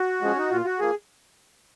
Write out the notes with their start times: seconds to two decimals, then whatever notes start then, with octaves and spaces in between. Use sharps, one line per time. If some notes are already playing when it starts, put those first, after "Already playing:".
Already playing: F#4
0.21 F3 G#3 C#4
0.38 D#4
0.51 A#2 F4
0.65 F#4
0.79 F3 A#3 G#4